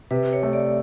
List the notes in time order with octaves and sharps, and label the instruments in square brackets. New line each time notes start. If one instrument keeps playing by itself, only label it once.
[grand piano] C3 [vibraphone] B4
[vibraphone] C#5
[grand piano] A3
[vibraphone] D5